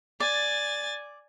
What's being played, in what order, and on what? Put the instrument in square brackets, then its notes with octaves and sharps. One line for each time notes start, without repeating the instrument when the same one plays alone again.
[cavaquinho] D5 [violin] G#5 A6